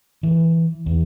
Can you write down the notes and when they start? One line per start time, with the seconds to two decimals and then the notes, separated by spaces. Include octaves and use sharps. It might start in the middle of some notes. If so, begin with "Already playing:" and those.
0.23 E3
0.86 E2